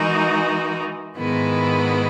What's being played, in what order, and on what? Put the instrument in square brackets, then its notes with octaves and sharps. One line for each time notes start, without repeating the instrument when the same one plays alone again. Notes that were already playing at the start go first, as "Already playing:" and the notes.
Already playing: [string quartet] E3 G#3 D#4 F#4 A#4
G#2 D#3 G#3 B3 E4